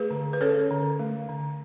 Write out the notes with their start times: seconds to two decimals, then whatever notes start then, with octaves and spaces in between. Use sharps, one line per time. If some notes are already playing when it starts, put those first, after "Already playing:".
Already playing: A3 G#4 B4
0.11 D3
0.33 B4
0.41 C#4 A4 C#5
0.71 D3
0.99 A3
1.29 D3